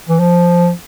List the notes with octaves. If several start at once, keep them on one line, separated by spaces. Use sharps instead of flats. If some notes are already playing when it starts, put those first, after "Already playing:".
E3
F3